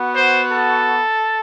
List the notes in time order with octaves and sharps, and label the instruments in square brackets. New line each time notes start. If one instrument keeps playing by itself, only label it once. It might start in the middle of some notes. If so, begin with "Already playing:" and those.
Already playing: [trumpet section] B3 F#4
C5
A4